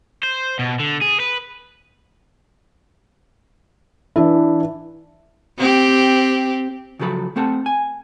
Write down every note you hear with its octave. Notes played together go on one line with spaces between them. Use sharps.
C5
B2
D3
G#4
B4
E3 D4 E4
C4 G4
C#3 F3 F#3 A4 B5
A3 C4 A4 F#5 A5
G#5